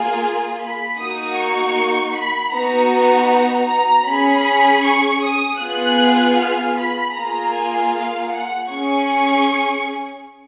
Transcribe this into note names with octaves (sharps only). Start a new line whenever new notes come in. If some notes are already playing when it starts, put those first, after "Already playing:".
Already playing: A#3 F4 G#4
B5
A#3 D#4 F#4 D#6
C#6
B5
B3 D#4 F#4 A#5
A#5
A#5
C#4 G#4 B5
C#6
D#6
B3 F4 G#4 F#6
F6
B5
A#3 F4 G#4 A#5
G#5
F5
F#5
C#4 G#4 C#6
C#6